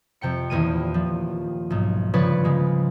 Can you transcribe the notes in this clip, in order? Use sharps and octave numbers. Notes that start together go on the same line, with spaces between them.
F2 C3 G5 C#7
D#1 E2 A#3 D#7
F3
B1 G#2
G1 C#3 F3 B4 C#5 D5
C#3 G#3 A#3